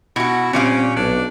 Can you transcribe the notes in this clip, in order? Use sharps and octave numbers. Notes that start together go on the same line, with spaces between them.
B2 E4 F#4
A#2 G3 C4 C#4 F5
B1 D4